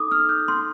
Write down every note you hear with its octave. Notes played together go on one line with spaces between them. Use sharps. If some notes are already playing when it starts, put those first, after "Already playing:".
Already playing: D#4 A4 D6 D#6
F6
G6
C6